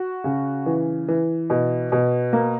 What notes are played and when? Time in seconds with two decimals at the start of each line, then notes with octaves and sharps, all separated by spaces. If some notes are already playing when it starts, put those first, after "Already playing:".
Already playing: F#4
0.24 C#3
0.66 E3
1.08 E3
1.50 B2
1.92 B2
2.33 A#3